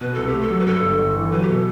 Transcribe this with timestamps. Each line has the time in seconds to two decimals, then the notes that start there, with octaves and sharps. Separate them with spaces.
0.01 B2 B4
0.14 C2 A4
0.28 G4
0.34 A3
0.41 A4
0.50 F#3
0.60 B4
0.66 G2 A4
0.82 G1
0.99 G1
1.16 E3
1.32 F#3 B4
1.42 G4
1.48 B2 A4